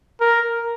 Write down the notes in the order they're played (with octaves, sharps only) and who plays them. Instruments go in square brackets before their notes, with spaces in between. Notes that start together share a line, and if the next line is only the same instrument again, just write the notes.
[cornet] A#4